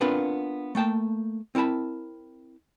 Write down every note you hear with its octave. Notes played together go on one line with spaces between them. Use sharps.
B3 C4 D4 F4 A#4 B4
A3 A#3 G5 A5
C4 E4 A#4 A5 B5